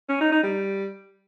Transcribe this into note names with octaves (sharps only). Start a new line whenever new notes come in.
C#4
D#4
D#4
G3